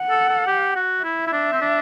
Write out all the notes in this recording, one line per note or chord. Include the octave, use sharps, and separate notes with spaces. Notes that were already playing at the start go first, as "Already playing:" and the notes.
Already playing: F#5
A4
A4
G4
F#4
E4 E5
E4
D4
C4
D4